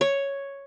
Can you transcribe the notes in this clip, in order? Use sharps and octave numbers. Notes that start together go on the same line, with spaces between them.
C#5